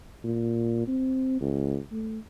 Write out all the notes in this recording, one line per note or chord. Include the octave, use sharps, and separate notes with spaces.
A#2
C4
C#2
A3